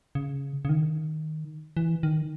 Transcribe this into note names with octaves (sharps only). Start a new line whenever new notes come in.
C#3
C#3
D#3
E3
D#3